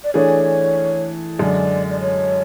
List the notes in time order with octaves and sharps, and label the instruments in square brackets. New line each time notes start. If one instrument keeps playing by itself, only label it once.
[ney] D5
[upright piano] E3 A3 D4 G#4 [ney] C#5
[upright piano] F#2 D3 G#3 [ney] D5
[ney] D5
C#5